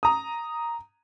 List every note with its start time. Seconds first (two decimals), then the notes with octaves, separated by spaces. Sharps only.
0.03 A#5 D#6